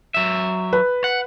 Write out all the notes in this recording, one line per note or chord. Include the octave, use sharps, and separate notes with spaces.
F#3 E5
B4
F#5